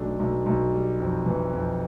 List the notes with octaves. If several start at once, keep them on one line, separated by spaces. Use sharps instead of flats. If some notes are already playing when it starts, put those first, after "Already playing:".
Already playing: B1 A3 D4
B1
B1
G3
F2
E3
F2